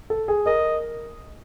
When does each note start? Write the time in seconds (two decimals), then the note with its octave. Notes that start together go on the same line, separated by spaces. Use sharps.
0.10 A4
0.28 G#4
0.46 A#4 D#5